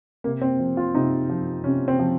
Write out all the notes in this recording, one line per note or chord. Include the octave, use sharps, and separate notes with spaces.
C3 A#3
C4
F3
F4
C3 D#4
F3
C3 C#4
C4
F3